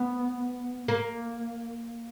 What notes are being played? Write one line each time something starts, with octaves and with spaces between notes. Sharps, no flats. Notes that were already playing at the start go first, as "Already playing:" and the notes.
Already playing: B3
A#3